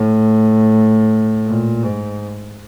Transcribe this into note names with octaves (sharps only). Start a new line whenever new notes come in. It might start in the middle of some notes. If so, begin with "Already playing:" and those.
Already playing: A2
A#2
G#2